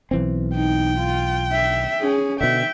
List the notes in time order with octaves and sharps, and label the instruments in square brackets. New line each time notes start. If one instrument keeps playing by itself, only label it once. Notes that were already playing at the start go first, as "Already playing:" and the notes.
[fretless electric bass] B1 E3 C4
[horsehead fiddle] D#4 [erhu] G5
[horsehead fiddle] F4
E5
C#4 G#4
[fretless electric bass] B2 D3 [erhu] E5 [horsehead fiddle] G5